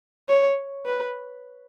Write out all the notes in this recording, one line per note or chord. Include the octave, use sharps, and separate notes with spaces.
C#5
B4